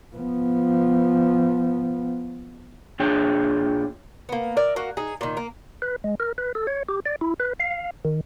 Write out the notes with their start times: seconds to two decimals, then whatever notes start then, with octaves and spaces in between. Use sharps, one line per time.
0.16 F3 B3
3.00 A#2 D4 F4 G#4 C#5 G5
4.29 A#3 B3
4.57 A#4 D5 E5
4.76 A#3 F#4
4.97 D#4 G#4
5.21 A#2 D#3
5.37 A#3
5.82 B4
6.04 G#3
6.20 A#4
6.38 B4
6.55 A4
6.67 C#5
6.89 G4
7.06 D5
7.21 E4
7.40 B4
7.60 F5
8.05 D#3